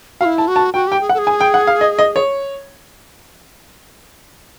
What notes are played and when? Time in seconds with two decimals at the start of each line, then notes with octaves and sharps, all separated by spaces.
0.20 F#4 F5
0.25 E4
0.38 A5
0.48 F#4
0.56 A5
0.74 F#4 G5
0.88 G4 G5
1.01 G#4
1.09 F#5
1.14 A4
1.18 G#4
1.27 G#5
1.40 G5
1.54 F#5
1.67 F5
1.81 D#5
1.99 D#5
2.16 C#5